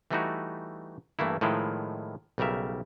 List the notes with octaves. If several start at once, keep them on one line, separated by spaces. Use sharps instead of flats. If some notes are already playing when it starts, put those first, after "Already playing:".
E3 G3 A3 D#4 E4 F#4
G2 E3 A3 A#3 E4
A2 D#3 F3 G#3 E4
B1 C#3 G3 A#4 E5